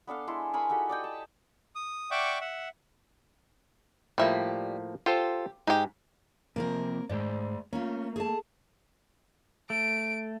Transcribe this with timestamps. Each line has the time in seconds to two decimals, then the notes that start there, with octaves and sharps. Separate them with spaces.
0.07 B3 D4 A4 F5
0.27 G#3 E4 A4 C6
0.53 G#4 A#4 B5 C#6
0.69 D#4 F#4 G4 A4
0.89 D5 D#5 G5
1.04 A5
1.75 D#6
2.11 D5 E5 F#5 G5 C#6 D6
2.41 E5 F#5
4.18 A2 F3 G3 A#3 E5
5.06 F4 G4 A4 C5
5.67 G#2 D#4 G4
6.56 C3 F3 A#3 C4 A#4
7.09 G#2 A3 C5 D5
7.73 A3 A#3 C#4 F4
8.16 G#4 A4 A5
9.70 A3 D7